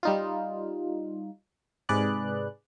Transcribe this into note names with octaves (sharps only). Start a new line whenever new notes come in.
G3 D#4 F4
G#2 C3 G#4 B4 D5 F#6